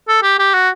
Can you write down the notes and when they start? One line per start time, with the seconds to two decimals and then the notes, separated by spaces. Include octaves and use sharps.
0.08 A4
0.23 G4
0.39 G4
0.54 F#4